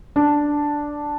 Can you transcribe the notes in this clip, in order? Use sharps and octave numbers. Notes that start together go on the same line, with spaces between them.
D4